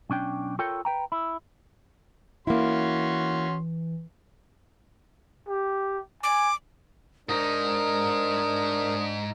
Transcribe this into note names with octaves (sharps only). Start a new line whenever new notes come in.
B1 C#4 D4 G5
F4 A4 A#4 C#5 G5
B4 G5 A#5
E4
E3 A#3 C#4 E4 F#4 C6
G4
G#5 D6
G#2 D4 D#4 A#4 D#6